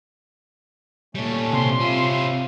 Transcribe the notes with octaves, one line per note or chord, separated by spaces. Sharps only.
A#2 G3 A3 C#4
C3 C6
C#4 E4 F4